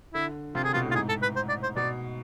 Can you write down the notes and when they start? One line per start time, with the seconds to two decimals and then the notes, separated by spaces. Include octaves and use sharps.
0.14 D3 E4
0.55 C3 F4
0.64 D3 G#4
0.73 B2 F4
0.84 A2
0.91 F4
0.95 G#2 G#4
1.09 A4
1.22 B4
1.36 C5
1.49 D5
1.63 C5
1.76 B2 D5